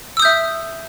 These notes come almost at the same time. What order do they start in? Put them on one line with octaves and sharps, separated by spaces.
E6 D#6 G6 E5